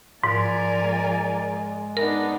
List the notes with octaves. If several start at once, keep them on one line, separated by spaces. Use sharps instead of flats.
G#2 F3 A#4 D5 G#5
G#3
B3 D4 D#4 A#4